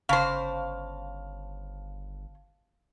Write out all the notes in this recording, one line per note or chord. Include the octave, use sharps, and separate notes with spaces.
G1 C#3 C5 F5 A5